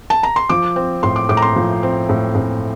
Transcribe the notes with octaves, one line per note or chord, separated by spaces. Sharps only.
A5
A#5
C6
F3 D6
C4
A2 C6
D6
A2 D6
A#5
C6
F3
C4
A2
A2